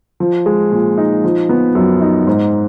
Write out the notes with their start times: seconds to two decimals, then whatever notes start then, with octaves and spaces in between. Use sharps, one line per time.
0.20 F3
0.46 G#3
0.72 A#2
0.98 D#4
1.24 F3
1.49 B3
1.75 F#2
2.01 D#4
2.27 G#2